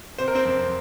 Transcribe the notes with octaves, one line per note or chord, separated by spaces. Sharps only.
C3 C5
A#4
C4 C5
F2